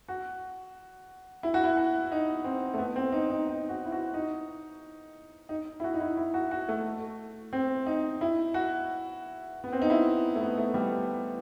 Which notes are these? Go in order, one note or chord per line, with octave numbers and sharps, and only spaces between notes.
F#4
E4
F#4
E4
F#4
D#4
C4
A3
B3
C4
D#4
D#4
D#4
F#4
E4
F#4
D#4
D#4
E4
F#4
D#4
E4
E4
F#4
F#4
A3
C4
D#4
E4
F#4
B3
C4
D#4
E4
A3
B3
A3
G3